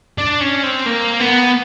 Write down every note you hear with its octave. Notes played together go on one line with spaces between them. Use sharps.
D4
C#4
C4
A#3
B3